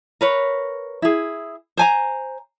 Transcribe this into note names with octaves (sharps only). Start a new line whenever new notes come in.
A#4 B4 C#5
E4 G#4
C5 G#5 A#5